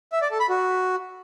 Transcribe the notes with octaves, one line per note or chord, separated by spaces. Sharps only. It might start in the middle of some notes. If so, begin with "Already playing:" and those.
E5
D5
A4
B5
F#4